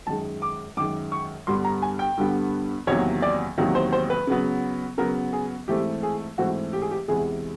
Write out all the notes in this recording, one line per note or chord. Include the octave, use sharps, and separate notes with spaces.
F#2 D#3 G#3 A5
D6
F#2 D#3 G#3 D6
C#6
G2 D3 G3 B3 C6
A#5
G#5
G5
G2 D3 G3 B3
E2 C3 D#3 F#3 A#3 C#5
D5
E2 C3 D#3 F#3 A#3
C5
C5
B4
C#3 F#3 B3
C#3 F#3 B3 A#4
G#4
G#2 E3 A3 C4 G4
G#4
G#2 E3 A3 C4 F#4
G4
G#4
G4
E2 C3 E3 G#3 G#4